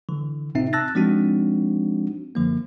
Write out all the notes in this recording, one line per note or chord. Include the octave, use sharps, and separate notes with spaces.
D3 E3
G1 A2 C3 C4 D#4 E5
A5 E6 F#6 A6 A#6
F3 G#3 C4 D4 D#4 F#4
F#2 D3 F3 A#3